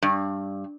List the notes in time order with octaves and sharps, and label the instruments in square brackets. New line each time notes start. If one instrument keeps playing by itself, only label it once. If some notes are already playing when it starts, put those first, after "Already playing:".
[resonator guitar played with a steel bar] G2